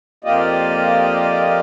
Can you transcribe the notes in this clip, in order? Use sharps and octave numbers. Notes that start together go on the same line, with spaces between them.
F2 A#3 F4 G4 D5 D#5